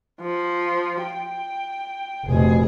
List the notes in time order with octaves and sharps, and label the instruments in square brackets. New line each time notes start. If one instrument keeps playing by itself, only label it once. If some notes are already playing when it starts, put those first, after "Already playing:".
[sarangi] F3
G5
[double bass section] F1 B2 [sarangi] G#4